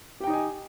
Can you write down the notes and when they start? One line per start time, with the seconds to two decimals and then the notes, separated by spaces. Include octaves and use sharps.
0.20 G4
0.24 G5
0.27 D#4
0.30 D#5
0.33 G#5